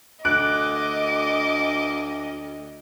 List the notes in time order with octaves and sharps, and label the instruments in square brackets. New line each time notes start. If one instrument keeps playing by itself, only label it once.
[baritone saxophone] D2 [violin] D#5 [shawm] D6 [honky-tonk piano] F#6 D7